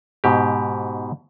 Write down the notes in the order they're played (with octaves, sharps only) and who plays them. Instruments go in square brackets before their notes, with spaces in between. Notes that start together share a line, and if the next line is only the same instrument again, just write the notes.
[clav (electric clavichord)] G#2 B2 G4